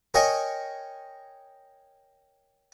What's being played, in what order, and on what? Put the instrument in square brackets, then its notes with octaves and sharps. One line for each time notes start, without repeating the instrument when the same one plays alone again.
[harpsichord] A#4 C#5 D#5 G5 G#5 C#6